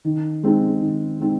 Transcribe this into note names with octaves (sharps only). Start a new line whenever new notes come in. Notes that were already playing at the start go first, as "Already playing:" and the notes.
D#3
G#3 C4 D#4
D#3
G#3 C4 D#4